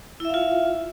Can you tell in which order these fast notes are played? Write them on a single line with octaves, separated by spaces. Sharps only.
E4 E5 F5 F4